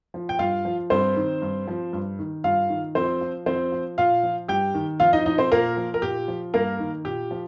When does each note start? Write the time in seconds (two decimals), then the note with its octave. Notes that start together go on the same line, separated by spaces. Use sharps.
0.14 F3
0.29 G5
0.39 G2 F4 F5
0.65 F3
0.90 G2 C4 C5
1.16 D#3
1.42 G2
1.67 F3
1.93 G2
2.19 D#3
2.44 G2 F4 F5
2.69 D#3
2.95 F2 C4 C5
3.21 F3
3.46 F2 C4 C5
3.72 F3
3.98 A#2 F4 F5
4.23 F3
4.48 G2 G4 G5
4.74 D#3
5.00 F2 F4 F5
5.13 D#4 D#5
5.26 F3 D#4 D#5
5.38 C4 C5
5.52 A#2 A#3 A#4
5.77 F3
5.94 A#4
6.02 A#2 G4
6.28 F3
6.54 G2 A#3 A#4
6.80 D#3
7.05 A#2 G4
7.31 F3